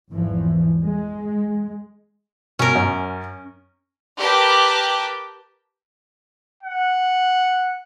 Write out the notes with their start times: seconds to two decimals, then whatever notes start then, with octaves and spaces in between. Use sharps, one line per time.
0.12 G#1 E2 E3 F3
0.83 G#3
2.59 B2 C#4 A#4
2.75 F#2
4.17 G4 A#4 B4 G5 A5 D6
6.63 F#5